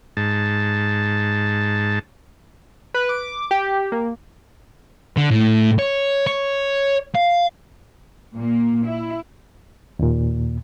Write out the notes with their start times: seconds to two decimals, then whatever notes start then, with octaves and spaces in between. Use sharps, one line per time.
0.17 G#2 A5
2.94 B4
3.09 D6
3.51 G4
3.92 A#3
5.17 D3
5.31 A2
5.79 C#5
6.27 C#5
7.15 F5
8.34 A#2 A#3
8.84 E4
9.99 D#2 A#2